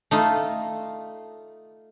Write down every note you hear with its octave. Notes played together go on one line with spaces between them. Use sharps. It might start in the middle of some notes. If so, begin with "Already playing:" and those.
A3 D#4 F4